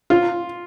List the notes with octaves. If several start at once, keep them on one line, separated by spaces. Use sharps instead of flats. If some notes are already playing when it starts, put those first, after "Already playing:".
F4